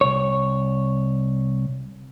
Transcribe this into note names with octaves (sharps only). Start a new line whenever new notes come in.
C2 C#5